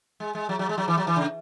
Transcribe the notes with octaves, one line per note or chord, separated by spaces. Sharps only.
G#3
G#3
F#3
F#3
G#3
F#3
E3
F#3
E3
C#3